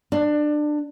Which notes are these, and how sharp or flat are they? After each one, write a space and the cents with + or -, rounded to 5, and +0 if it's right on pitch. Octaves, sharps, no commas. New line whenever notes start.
D4 +20